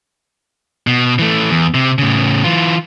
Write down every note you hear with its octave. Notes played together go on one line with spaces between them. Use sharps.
B2
E3 A3
E2
C3
A2 C#3
E3 F4